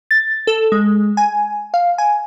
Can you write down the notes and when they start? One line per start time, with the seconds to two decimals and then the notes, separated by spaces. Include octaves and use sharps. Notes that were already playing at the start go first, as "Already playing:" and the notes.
0.11 A6
0.47 A4
0.72 G#3
1.17 G#5
1.74 F5
1.98 G#5